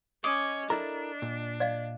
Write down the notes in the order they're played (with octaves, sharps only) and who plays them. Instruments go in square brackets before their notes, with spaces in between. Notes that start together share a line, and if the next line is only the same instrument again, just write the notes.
[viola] C#4 [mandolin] D#5 D6
[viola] D4 [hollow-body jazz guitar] E4 A4 A#4 [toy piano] A#5
[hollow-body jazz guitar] A#2
[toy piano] D5 D#5 F5